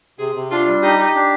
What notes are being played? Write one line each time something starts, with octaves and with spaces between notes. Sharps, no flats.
C3 G#4
C3
D4 F4
G3
D#4 G4
G4
D4